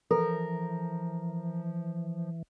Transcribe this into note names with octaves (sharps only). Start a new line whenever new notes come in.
E3 F3 A4 A#4